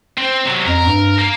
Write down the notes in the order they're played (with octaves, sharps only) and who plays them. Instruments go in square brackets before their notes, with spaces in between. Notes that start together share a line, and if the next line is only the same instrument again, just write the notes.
[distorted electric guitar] C4
C3 F#3
[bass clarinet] F2 [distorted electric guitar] A#4
[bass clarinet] G2
[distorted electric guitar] A#3